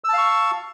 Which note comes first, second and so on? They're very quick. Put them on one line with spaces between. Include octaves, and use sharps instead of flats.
E6 A5 F5 C#6